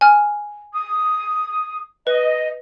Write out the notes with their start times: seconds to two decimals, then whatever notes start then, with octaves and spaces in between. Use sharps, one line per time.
0.01 G#5 F6
0.73 D#6
2.07 B4 D#5